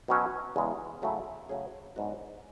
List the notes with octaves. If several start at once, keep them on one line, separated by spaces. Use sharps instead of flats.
B2 F#3 C#4
E2 C#3 G#3
C#3 F#3 A3 C#4 E4
C#3 F#3 A3 C#4 G#4
G#2 F#3 B3 D4 F#4